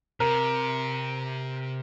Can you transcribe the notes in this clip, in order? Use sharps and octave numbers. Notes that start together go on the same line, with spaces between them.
C3 A#4